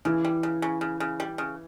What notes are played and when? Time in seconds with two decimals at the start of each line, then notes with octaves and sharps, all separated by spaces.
0.05 C#3 E3
0.25 G3
0.43 C#3
0.62 C#3
0.81 C#3
1.00 C#3
1.20 G3
1.38 C#3